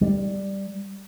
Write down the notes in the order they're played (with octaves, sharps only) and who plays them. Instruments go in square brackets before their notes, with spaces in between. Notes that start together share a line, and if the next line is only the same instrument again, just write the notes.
[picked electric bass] G3